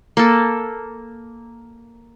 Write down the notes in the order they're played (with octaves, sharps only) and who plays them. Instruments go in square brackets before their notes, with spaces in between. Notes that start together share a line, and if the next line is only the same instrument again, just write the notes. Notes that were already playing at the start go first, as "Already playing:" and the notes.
[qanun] A#3 A4